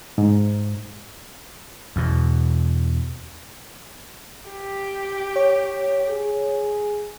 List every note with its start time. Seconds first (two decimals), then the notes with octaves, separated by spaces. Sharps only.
0.18 G#2
1.96 E2 B2
4.51 G4
5.36 C#5
6.10 G#4